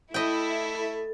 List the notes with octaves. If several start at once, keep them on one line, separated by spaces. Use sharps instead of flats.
A3 E4 D#5 G5
A4